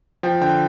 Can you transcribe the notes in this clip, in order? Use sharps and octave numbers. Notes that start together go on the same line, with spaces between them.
F3 G5
D3 G5